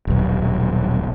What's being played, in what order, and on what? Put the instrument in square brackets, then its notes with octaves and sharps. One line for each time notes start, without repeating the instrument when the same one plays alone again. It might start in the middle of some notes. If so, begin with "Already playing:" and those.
[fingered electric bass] D#1 B1